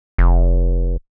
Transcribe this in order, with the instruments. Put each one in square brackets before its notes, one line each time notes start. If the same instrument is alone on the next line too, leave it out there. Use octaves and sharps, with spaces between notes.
[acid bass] F1